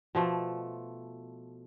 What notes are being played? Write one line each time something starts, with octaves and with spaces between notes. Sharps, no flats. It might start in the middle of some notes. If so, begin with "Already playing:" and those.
B2 F3 A3